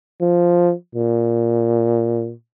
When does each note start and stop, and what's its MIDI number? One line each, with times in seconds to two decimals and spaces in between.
0.21 0.73 53
0.95 2.32 46